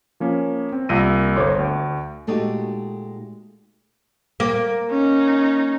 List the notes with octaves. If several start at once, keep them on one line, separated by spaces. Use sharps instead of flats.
F3 A#3 C#4
C4
C2 A#3 F4 E6 A#6 D#7
G1 A4 C5 C#5 C6 D6
D2
A#2 G#3 A3 D#4 F#4 G4
A#3
C#4 D#4